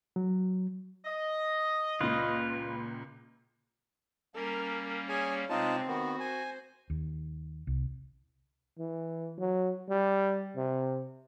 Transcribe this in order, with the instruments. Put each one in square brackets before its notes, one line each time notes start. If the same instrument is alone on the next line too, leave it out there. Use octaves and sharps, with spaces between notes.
[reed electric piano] F#3
[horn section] D#5
[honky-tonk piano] C#2 A#2 [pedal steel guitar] F4 B4
[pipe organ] G3 A#3 C#4 [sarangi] A#4
[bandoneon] G#4 G#5 [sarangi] C#5
[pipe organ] C3 G#3 [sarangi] C4 [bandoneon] D#4 F4 A5
[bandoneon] D#3 B3 [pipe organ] F#4
[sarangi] C5 [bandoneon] G#5
[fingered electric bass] D#2
C2
[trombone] E3
F#3
G3
C3